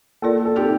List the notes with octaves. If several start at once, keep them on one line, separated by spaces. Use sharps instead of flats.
A#3 F4 A4 A#4 D5
A4
C4 D#4 G4 A4